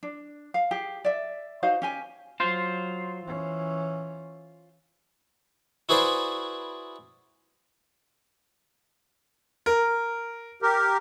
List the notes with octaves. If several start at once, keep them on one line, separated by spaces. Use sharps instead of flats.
D4
F5
G4 G#4
D5 E5
D#4 F#4 C5 F5
C#4 G4 G#5
F#3 F4 C5
E3 C#4
E4 F#4 G#4 B4 C5 D5
A#4
G4 A#4